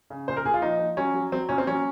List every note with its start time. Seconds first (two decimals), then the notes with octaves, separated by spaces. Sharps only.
0.10 C#3
0.28 A#2 C5
0.37 A#4
0.45 A#2 G#4
0.54 F4
0.62 F3 D#4
0.80 F3
0.97 F#3 C#4
1.15 F#3
1.32 F#3 C4
1.49 A#2 C#4
1.58 C4
1.67 F#3 C#4